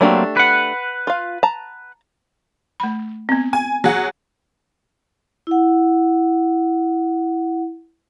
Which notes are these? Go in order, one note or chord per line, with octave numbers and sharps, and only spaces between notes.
F#3 A3 A#3 C4 D4 G4
B4 F#5
F4 F5
A5 A#5
A3 B5
B3 C4
G#5
F#3 G#4 F#5
E4 F#5